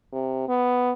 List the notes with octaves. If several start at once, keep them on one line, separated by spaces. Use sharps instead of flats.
C3
B3